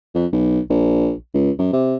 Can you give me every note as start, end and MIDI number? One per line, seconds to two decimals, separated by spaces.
0.15 0.26 41
0.33 0.60 35
0.70 1.13 34
1.34 1.51 37
1.59 1.71 42
1.73 1.96 48